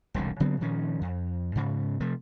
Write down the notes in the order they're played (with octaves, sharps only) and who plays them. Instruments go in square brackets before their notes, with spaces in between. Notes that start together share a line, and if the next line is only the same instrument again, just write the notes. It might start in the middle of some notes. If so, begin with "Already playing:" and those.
[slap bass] E1 C2 D3
C#3 F#3 B3 C4
A#2 D#3 F3 C#4
F2
G#2 C#3
C3 F3 A3